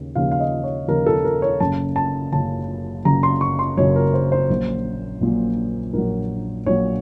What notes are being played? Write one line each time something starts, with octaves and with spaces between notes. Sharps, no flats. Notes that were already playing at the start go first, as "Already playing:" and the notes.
Already playing: D#2 C#3
D#2 C#3 F3 F5
F5
D#5
C#5
D#2 C#3 F3 A#4
A4
A#4
C#5
F#1 F#2 C#3 A5
A5
F#1 F#2 C#3 A5
F#1 F#2 C#3 A#5
C6
C#6
C6
F#1 F#2 C#3 C#5
A#4
C5
C5
A#1 A#2 F#3
A#1 A#2 F#3
A#1 A#2 F#3 A#4
A#1 A#2 F#3 C#5